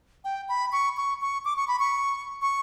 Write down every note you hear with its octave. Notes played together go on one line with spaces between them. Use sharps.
G5
B5
C#6
C#6
C#6
D6
C#6
B5
C#6
C#6